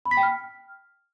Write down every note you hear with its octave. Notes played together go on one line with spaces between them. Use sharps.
B5
B6
G5
F6